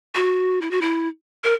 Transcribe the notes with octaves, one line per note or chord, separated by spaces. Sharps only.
F#4
E4
F#4
E4
A#4